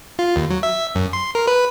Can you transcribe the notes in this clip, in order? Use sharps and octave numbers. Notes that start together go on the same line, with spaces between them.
F4
D#2
F#3
E5
F#2
C6
A#4
B4